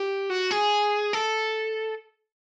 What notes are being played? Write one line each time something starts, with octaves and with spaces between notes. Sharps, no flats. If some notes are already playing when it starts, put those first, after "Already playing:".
Already playing: G4
F#4
G#4
A4